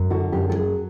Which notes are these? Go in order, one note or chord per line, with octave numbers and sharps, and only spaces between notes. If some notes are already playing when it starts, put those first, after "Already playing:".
Already playing: F#2
D3 F#4
F#2 G4
A4
F#3 G#4